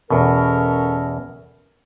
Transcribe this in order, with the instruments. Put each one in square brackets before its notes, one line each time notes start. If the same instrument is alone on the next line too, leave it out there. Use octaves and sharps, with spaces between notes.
[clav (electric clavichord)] E2 B2 [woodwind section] C#4 A4 A#4